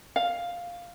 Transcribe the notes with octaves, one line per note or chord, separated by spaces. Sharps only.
F5